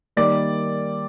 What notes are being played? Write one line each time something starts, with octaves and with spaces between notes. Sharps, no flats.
D#3 G3 A#3 D5